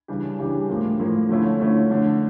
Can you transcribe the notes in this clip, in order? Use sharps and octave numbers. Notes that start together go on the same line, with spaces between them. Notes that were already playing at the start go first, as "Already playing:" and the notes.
C#3 E3 G3 D4 G4
C#3 E3 G3 D4 G4
A2 F3 A#3
A2 F3 A#3
D3 F3 A3 C#4 E4
D3 F3 A3 C#4 E4
D3 A3 D4